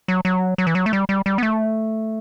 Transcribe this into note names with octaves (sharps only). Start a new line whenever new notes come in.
F#3
F#3
F#3
E3
F#3
A3
G3
G3
G3
B3
A3